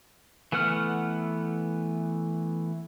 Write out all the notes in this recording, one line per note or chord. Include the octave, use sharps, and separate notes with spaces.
E3 A3 B3 F#5 F6